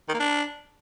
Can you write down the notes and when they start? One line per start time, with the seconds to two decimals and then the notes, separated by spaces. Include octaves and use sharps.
0.09 D#3
0.14 A#3
0.19 D4